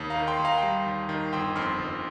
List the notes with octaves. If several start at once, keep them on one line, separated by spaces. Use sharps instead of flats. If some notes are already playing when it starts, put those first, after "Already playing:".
Already playing: D#2
F5 A#5
D#3
G5 C6
D#2
F5 A#5
G5
G3 F5 A#5
D#2
D#3
G1 G5 C6
F2 C6 F6
G1